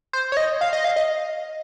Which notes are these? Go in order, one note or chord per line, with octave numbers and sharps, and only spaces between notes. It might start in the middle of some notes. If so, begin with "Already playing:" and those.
C5
C#5
D#5
F5
D#5
F5
D#5